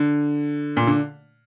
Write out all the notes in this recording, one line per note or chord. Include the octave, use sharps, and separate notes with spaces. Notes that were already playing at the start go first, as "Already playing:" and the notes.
Already playing: D3
A#2
D3